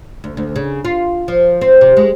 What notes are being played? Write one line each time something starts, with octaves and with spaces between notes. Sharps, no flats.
D2
D2
C#3
F4
F3
C4
C3
G#3